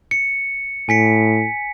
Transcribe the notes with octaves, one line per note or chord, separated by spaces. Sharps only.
C#7
A2 G#5 B6 C#7